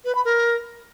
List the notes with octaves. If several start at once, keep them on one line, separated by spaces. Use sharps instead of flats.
B4
B5
A#4